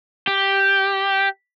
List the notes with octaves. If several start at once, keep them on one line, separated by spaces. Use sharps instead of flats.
G4